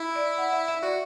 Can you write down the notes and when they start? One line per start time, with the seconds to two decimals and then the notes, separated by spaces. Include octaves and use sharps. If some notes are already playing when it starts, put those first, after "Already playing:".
Already playing: E4
0.16 D5
0.38 F#5
0.53 E5
0.68 E5
0.83 F#4 D5